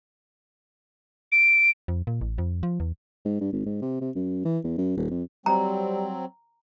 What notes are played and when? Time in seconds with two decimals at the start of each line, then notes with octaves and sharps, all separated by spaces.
1.32 D7
1.88 F2
2.07 A#2
2.21 A1
2.38 F2
2.63 F3
2.80 E2
3.25 G#2
3.41 G2
3.52 G#1
3.66 G#2
3.81 C3
4.01 C3
4.15 F#2
4.45 E3
4.64 E2
4.78 F#2
4.97 D#1
5.10 F2
5.46 F#3 G3 C4 A#5